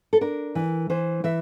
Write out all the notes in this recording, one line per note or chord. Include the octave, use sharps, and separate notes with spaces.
A4
D4 A#4
E3
E3 C5
E3 E5